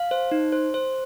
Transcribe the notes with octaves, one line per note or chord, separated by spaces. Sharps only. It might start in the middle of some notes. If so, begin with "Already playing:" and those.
Already playing: F5
C5
D#4
C5
C5